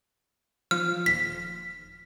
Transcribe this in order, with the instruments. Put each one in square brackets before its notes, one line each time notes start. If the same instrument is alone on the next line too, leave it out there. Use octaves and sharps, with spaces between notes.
[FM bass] F3 [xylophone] F6
[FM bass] D#1 [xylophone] B6